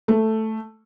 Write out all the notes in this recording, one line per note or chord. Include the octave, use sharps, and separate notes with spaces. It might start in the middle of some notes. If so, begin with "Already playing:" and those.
A3